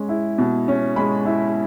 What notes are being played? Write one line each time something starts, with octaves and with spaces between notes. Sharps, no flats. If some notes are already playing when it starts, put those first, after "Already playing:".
Already playing: G#3 C#4
E4
B2
C#4
G#3 B5
E4